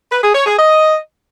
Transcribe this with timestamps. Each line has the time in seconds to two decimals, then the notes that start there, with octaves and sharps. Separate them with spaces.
0.11 B4
0.23 G#4
0.34 C#5
0.46 G#4
0.57 D#5